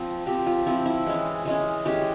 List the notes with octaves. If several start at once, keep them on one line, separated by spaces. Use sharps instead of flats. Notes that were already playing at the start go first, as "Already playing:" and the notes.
Already playing: F3 C4
F3 C4 G4
F4
F3 C4 E4
E4
E3 G#3 C#4
E3 G#3 C#4
E3 G#3 C#4 G4